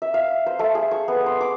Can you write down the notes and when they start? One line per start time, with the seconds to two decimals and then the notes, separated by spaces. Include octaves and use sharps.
0.02 E5
0.14 F5
0.46 C5
0.59 A3
0.75 G#4
0.91 C#6
1.08 B3
1.26 C6
1.41 D6